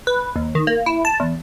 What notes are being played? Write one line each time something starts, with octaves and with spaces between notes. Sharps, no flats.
B4
D#2
D#3
A#3
E4
A5
E2